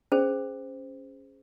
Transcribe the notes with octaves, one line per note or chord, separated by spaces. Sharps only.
C#4 G#4 C5